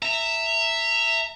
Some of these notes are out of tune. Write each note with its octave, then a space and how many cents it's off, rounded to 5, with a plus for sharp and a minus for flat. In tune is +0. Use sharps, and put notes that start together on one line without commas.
E5 +0 A#5 -30